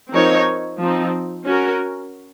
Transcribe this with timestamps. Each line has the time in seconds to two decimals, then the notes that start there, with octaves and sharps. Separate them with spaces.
0.12 F3 C4 D#4 A#4 C#5
0.79 F3 C4 D#4
1.46 C#4 F#4 A#4